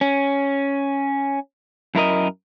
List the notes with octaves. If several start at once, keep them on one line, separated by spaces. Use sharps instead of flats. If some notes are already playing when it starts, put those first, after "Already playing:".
C#4
F#2 E4 A#4 D#5